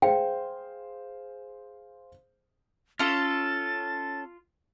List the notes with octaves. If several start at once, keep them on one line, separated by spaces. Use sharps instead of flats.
G#4 C5 F5 G5
C#4 F4 A4 A6